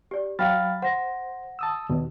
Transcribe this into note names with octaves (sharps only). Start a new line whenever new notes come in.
G4 D5
F#3 F5 G5 B5 F6 A6
C5 F#5 A#6
A5 D#6 E6
D#2 B2